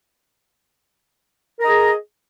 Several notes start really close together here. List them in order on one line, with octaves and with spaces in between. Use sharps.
A#4 A#5 D#5 G#4